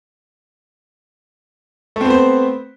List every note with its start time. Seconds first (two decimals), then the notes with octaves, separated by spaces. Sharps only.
1.96 A3
2.01 C4
2.05 B3
2.10 C5